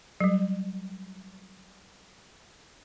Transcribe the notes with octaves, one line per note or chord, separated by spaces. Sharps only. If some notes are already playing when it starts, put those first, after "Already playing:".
F#3 G3